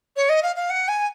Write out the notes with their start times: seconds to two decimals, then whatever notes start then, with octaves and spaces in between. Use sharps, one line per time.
0.16 C#5
0.29 D#5
0.43 F5
0.56 F5
0.70 F#5
0.88 G#5